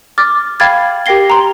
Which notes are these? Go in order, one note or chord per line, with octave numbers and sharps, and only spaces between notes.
D6 F6 A6
F5 G5 B5 F6 G#6 A6
G4 A#4 G5 A#6 C7 G7
A#5 C6